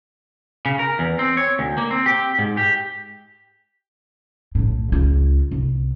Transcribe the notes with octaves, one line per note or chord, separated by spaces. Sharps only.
C#3
A#4
E2
C4
C#5
D2
A#3
C4
G4
G#2
G4
B1 A2
C#2 F4
C2